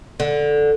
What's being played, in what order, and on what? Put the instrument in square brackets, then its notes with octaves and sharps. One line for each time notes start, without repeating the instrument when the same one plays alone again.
[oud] D3